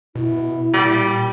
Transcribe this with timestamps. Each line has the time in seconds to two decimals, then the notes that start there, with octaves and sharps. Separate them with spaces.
0.15 B2 E4
0.74 A#2 G3